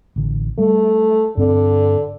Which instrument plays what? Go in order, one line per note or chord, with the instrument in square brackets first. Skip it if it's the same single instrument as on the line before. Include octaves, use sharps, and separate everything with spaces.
[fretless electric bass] A1 D3
[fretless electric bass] G3 [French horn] A3
[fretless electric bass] G2 C4 [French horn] D3